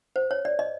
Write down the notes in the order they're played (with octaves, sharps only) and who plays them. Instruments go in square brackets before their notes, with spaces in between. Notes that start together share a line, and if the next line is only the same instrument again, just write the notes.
[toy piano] C5
C#5
D5
D#5